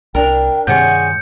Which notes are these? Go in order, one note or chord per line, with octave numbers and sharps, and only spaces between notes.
C2 D4 A#4 G5
G2 C3 D#3 G#4 C#5 F#5 G6 C#7